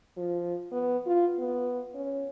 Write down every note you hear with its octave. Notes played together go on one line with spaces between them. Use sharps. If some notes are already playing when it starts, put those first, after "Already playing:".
F3
B3
F4
B3
C#4